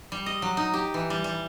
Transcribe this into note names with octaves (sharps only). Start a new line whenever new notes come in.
G3
D#5
F#3
D#4
G4
E3
G3
G3